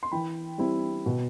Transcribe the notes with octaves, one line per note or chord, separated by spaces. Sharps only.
C6
E3 G5 B5
G3 C4 E4
B2